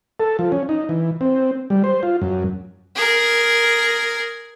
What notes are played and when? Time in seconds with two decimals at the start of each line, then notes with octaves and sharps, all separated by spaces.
0.20 A4
0.39 F3
0.52 C#4
0.69 D#4
0.89 E3
1.21 C4
1.70 G3
1.84 C5
2.03 F4
2.22 F#2
2.95 G#4 A#4